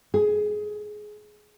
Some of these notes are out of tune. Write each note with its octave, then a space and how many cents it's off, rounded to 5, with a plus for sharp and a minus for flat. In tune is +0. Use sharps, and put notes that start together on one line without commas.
G#4 +15